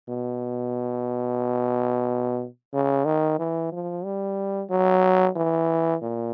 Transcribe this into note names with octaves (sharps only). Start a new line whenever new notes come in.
B2
C#3
D#3
E3
F3
G3
F#3
E3
A#2